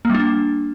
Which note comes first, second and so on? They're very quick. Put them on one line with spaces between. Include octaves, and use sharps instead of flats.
A#3 G3 D4